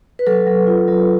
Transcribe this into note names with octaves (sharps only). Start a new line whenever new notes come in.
B4
F#3 A4
F#3
F4
F#3